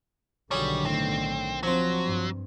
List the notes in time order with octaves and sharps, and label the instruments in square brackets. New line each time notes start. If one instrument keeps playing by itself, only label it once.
[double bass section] B1 D3 D#3 [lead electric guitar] G3 [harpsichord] F#4 G#4 C#5
[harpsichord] A2 [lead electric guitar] C4
[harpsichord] F3 C5 [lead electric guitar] F#3 [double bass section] C4
[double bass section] G2